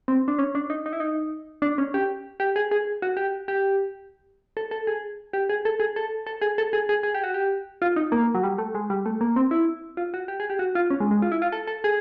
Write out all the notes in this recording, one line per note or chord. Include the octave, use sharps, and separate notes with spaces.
C4
D4
C#4
D4
D#4
D#4
E4
D#4
D4
C#4
G4
G4
G#4
G#4
F#4
G4
G4
A4
A4
G#4
G4
G#4
A4
G#4
A4
A4
G#4
A4
G#4
G#4
G#4
G4
F#4
G4
F4
D#4
A#3
F#3
G3
A3
G#3
G3
A3
A#3
C4
E4
F4
F#4
G4
G#4
G4
F#4
F4
C#4
G#3
G#3
F4
E4
F4
A4
A4
G#4